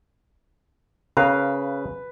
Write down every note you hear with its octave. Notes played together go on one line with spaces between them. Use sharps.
C#3 A#4 B4 F5